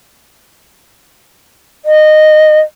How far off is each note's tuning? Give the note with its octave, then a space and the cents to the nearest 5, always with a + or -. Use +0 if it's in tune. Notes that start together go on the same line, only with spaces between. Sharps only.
D#5 -15